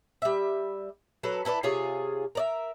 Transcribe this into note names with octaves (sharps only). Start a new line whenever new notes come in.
G3 E5
F#3 A4 B4
E4 A4 B4 D5
C3 F4 G#4 C#5
A#4 D5 E5